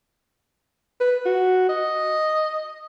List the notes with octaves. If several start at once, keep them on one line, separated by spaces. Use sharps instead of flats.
B4
F#4
D#5